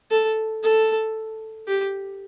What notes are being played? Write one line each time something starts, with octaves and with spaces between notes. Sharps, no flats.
A4
A4
G4